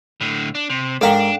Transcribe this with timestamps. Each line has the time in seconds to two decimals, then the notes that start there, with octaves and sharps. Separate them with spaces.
0.21 A2 D3
0.55 D4
0.70 C3
1.01 G#2 D4 A4 A#4 F5 G5